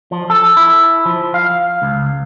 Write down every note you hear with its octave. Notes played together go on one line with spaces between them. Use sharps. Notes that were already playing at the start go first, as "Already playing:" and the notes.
F3
A4
E4
F3
F5
C#2